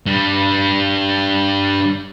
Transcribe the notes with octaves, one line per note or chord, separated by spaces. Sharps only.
G2 G3